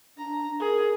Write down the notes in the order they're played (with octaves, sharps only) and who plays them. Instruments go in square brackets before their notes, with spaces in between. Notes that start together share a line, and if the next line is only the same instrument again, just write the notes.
[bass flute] D4 [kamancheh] A#5
[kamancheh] G#4 [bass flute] A#4